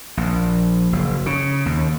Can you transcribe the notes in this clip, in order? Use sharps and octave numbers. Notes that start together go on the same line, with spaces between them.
A#1
F#1
C#3
D#2